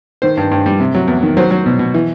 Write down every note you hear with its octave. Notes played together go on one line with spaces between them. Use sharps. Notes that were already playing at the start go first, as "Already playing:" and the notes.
D#3 C5
G2
G2
G3
C3
F#3
E2
D#3
F#3 C5
F#3
B2
B2
E3